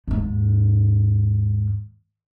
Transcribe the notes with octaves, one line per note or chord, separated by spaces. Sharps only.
D#2 G#2